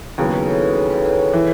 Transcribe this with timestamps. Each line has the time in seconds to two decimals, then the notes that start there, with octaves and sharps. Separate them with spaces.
0.18 D#2 C#3 F#3 B3 E4 G#4
0.33 G#4 B4
0.47 A4 C#5
0.61 G#4 B4
0.76 A4 C#5
0.90 G#4 B4
1.05 G#4 B4
1.19 A4 C#5
1.33 E3